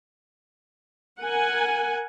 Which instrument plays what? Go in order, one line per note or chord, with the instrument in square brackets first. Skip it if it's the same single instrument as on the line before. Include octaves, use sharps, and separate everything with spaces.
[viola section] A#4 F#5 G#5